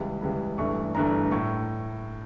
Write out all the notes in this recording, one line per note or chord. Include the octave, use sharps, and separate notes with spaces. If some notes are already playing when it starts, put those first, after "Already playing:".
Already playing: C#2 C#3 E3 G3
C#2 C#3 E3 G3
G1 G2 E3 A3 C#6
G1 G2 E3 A3 A#5
A2 C#6